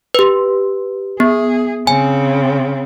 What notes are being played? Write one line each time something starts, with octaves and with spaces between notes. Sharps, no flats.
G4 B4
B3 G#4
C#3 C4 G#5